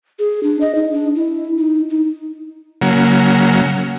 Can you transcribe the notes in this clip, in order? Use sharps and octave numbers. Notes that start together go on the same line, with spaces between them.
G#4
D4
D#5
D#4
D4
E4
D#4
D#4
C#3 F#3 A#3